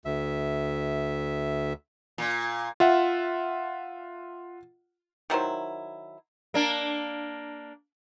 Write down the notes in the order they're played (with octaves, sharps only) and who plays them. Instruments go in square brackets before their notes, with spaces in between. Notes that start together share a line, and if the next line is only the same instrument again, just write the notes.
[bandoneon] D2 E5
[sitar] A#2
[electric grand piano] F4 E5 F#5
[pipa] D#3 F#3 E4 C5
[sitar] A#3 D4